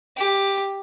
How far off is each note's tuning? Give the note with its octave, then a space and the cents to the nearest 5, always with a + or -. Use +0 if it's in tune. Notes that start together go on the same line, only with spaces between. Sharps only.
G4 +5